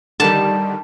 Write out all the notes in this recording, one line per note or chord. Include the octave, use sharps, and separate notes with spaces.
D3 D#3 G3 A5